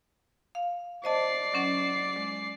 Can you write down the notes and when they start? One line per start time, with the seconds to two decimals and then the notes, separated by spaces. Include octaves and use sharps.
0.55 F5
1.04 C5 D5 D#5 A5 C7
1.54 F#3 C#4 F#5
2.16 G#3